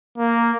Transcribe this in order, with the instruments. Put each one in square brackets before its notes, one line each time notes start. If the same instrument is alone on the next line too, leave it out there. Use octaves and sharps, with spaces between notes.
[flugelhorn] A#3